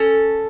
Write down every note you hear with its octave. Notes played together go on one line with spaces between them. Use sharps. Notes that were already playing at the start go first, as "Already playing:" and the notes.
Already playing: C#4 A4